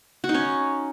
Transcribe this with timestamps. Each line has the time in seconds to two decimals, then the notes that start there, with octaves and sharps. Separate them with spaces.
0.24 F#4
0.29 D#4
0.34 C#4